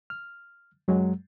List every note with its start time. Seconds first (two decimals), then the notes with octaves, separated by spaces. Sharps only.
0.10 F6
0.88 F#2 F#3 G#3